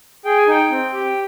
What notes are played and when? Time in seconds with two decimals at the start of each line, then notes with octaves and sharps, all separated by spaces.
0.25 G#4 G5
0.37 G#5
0.47 D#4 G5
0.70 C4
0.94 G4